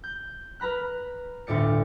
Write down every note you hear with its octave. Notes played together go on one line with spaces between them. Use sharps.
G6
A#4 B4 A#5 B5 F#6
G1 D2 A2 D5 C#7